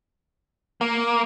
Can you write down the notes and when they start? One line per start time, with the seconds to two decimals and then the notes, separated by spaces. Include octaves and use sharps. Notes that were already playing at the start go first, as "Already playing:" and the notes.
0.81 A#3